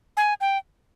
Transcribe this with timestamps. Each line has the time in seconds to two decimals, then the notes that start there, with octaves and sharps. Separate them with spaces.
0.17 G#5
0.41 G5